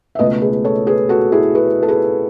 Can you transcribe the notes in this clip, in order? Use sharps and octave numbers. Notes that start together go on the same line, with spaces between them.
E5
C#2 B2 A3 B4 D#5
G#4 B4
A4 C#5
G#4 B4
F#4 A4
E4 G#4
G#4 B4
A4
G#4 B4